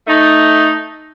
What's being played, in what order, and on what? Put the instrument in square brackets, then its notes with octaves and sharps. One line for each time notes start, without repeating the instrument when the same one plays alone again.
[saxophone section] A3 D#4